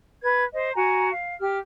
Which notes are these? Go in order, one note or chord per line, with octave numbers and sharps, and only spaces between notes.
B4 G#6
C5 D#5
F#4 G#5 A#5
F5
G4 F6